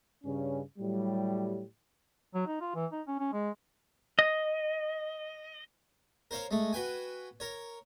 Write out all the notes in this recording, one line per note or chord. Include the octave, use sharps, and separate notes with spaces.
G2 C#3 C#4
A2 F#3 G3
F#3
D#4
F4
E3
D#4
C#4
C#4
G#3
D#5
A#4 C5 C#5 F5
G#3 A3
F#4 B4 G5 G#5
A#4 C#5